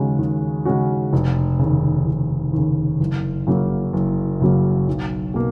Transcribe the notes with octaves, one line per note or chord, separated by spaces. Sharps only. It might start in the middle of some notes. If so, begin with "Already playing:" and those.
Already playing: D#2 C#3 G#3 C#4 F#4
D#2
C#3 G#3 C#4 F#4
F1
D#2 C#3
F1
D#2 C#3
F#1
F#2 C#3 F#3 A#3
F#1
F#2 C#3 F#3 A#3
B1
B2 A#3